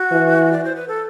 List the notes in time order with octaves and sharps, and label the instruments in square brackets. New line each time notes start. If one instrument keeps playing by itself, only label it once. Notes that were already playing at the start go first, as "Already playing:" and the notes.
Already playing: [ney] F#4
[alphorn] E3
[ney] D5
C5
B4
A4